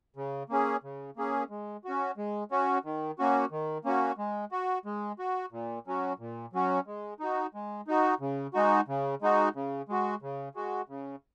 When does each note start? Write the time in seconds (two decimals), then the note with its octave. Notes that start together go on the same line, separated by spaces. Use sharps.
0.16 C#3
0.49 A#3 C#4 G#4
0.84 C#3
1.17 A#3 C#4 G#4
1.50 G#3
1.84 C#4 F#4
2.17 G#3
2.51 C#4 F#4
2.85 D#3
3.19 A#3 C#4 F#4
3.51 D#3
3.85 A#3 C#4 F#4
4.18 G#3
4.52 F#4
4.85 G#3
5.19 F#4
5.52 A#2
5.87 F#3 C#4 F#4
6.19 A#2
6.53 F#3 C#4 F#4
6.87 G#3
7.20 D#4 F#4
7.54 G#3
7.87 D#4 F#4
8.20 C#3
8.54 G#3 D#4 F#4
8.88 C#3
9.22 G#3 D#4 F#4
9.55 C#3
9.89 G#3 F#4
10.22 C#3
10.55 G#3 F#4
10.89 C#3